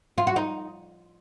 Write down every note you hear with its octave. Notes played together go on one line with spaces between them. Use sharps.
F4
F#4
D#4